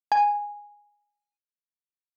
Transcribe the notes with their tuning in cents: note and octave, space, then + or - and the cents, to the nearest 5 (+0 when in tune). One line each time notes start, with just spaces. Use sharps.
G#5 -10